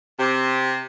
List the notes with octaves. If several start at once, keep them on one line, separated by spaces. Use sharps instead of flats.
C3